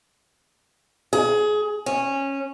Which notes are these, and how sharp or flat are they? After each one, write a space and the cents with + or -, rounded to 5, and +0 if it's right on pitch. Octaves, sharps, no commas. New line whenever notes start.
G#4 +25
C#4 -15